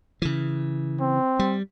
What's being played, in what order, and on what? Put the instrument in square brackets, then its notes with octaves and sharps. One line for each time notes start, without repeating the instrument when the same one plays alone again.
[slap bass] C#3 E3
[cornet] C4
[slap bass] G3